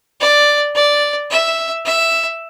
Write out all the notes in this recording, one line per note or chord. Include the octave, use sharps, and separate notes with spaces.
D5
D5
E5
E5